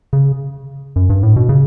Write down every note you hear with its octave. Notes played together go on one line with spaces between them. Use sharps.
C#3
F#2
G2
A2
B2
C#3